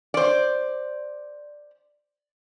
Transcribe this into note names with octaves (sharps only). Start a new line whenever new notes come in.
C5 D5